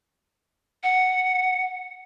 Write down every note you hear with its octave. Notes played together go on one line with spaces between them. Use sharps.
F#5